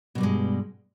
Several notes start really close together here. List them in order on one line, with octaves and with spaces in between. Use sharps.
B2 G3 G2 G#3